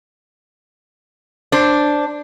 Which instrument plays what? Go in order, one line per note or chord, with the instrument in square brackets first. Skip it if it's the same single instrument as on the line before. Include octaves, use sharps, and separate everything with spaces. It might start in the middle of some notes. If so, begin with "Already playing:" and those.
[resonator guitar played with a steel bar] D4 C5